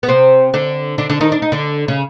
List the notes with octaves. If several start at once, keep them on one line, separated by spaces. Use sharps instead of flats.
B3
C3 C4
D3 D4
D3 D4
D3 D4
D#3 D#4
D4
D#4
D3 D4
C#3 C#4